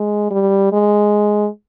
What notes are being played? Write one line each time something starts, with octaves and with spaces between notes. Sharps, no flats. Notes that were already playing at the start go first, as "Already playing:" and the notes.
Already playing: G#3
G3
G#3